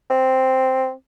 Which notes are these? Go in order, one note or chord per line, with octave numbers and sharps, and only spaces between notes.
C4